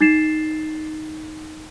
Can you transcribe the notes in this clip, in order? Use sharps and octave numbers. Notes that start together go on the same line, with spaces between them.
D#4 A6 C7 E7